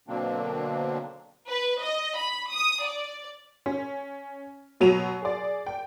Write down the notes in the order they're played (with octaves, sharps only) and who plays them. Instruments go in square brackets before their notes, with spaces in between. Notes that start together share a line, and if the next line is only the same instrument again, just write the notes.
[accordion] B2 D3 F#3 A#3 C4 D4
[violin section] B4
D#5
B5
D#6
D5
[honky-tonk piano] C#4
B2 F#3 D#7 F7
G#4 D5
G5